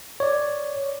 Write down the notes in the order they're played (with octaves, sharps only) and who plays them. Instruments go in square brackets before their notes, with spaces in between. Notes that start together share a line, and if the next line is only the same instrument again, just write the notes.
[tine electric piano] C#5 D5